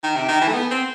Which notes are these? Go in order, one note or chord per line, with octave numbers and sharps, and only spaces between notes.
D#3
C3
D#3
E3
A3
B3
C4